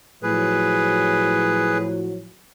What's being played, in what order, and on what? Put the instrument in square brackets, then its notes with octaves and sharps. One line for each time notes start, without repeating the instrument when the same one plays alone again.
[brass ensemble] A2 F3 F#3 [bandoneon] G#4 B4